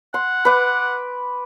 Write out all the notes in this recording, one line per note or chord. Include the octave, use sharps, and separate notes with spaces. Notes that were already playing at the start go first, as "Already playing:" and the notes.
F#5 C6
B4 D6